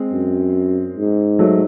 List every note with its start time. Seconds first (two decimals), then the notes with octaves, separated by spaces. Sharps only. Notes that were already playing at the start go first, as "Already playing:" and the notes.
Already playing: G#3 C4
0.12 F#2
0.97 G#2
1.39 F#3 A3